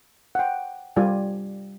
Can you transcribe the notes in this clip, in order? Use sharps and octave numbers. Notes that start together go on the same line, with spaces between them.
F#5 G5
G3 F4 G4 D5 G#5